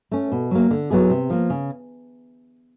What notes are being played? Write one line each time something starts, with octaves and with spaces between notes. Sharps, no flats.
A3 C#4
B2
F#3 A#3
D3
F#3 B3 E4 G#4
C3
F3 A#3
C#3